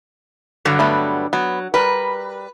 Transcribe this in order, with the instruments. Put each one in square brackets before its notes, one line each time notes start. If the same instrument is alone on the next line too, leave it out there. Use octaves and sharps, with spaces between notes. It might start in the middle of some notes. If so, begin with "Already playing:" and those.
[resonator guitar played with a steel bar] G2 D3 F#3
[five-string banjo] G3 A3 B3
[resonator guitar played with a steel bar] F#3 [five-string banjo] B3
[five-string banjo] G3 A#4 [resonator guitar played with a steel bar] B4